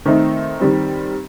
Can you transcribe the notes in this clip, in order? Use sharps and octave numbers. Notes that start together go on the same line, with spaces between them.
D#3 A3 C4 D#4
D#3 G3 C4